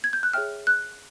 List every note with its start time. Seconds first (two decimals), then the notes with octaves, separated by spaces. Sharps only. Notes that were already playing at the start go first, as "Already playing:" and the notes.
0.04 G#6
0.13 G6
0.23 F#6
0.34 G#4 C#5 E5 G5 F6
0.67 F#6